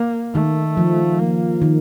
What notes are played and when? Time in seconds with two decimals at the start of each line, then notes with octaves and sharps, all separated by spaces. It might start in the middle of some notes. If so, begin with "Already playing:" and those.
Already playing: A#3
0.34 D#3 A3
0.77 F3
1.19 A#3
1.62 D#3